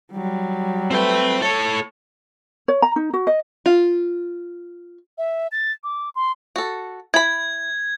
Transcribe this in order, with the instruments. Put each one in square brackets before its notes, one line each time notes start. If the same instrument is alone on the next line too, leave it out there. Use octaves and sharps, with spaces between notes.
[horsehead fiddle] F#3 G3
[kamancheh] A3 B4 [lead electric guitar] C4 G5
[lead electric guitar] A2 A4 [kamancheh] C#5
[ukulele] C#5
A#5
D#4
F#4
D#5
[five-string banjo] F4
[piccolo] E5
A6
D6
C6
[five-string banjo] F#4 A4
[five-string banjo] E4 B5 [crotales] G#6